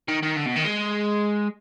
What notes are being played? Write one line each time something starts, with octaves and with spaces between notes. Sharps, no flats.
D#3
D#3
D3
B2
D#3
G#3